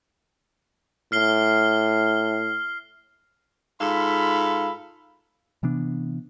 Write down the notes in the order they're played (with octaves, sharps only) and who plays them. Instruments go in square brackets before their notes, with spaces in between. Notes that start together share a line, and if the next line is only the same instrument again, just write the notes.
[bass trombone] A2 [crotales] F6 C7 G7
[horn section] G#2 F4 A4 F5 B5
[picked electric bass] C3 E3 B3 D4